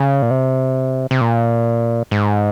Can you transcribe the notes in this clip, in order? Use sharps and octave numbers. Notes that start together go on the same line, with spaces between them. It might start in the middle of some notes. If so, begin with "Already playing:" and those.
Already playing: C#3
A#2
C3
C3
A#2
G#2